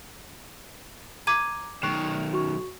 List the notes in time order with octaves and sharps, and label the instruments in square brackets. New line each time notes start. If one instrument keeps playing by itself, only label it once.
[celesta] A#5 [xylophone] D6 G#6 D#7
[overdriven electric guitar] B1 D#3 [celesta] C#6 F#6 C7
[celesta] F#4 C#6